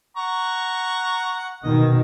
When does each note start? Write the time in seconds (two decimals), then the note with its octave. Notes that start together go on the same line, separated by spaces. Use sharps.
0.17 F#5 A#5 C#6
1.63 B2 D#3 D#5